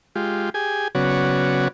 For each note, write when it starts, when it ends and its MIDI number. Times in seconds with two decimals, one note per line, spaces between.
0.15 0.50 56
0.15 0.50 65
0.15 0.50 67
0.54 0.88 67
0.54 0.88 68
0.54 0.88 80
0.95 1.68 49
0.95 1.68 54
0.95 1.68 59
0.95 1.68 66
0.95 1.68 73
0.95 1.68 74